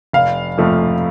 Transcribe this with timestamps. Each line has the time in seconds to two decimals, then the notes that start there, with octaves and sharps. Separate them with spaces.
0.13 F1 F5
0.58 F2 F3 A3